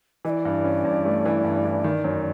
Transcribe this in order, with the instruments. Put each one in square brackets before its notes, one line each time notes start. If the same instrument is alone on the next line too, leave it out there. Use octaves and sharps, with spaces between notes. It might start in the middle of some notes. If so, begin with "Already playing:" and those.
[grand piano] E3 [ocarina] D#5
[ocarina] D5
[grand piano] G2
C#4
G2
A3
E3
G2
E3
D#3
F#2